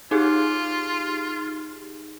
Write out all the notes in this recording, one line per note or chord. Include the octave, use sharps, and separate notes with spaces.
D#4 F4 G4 G#4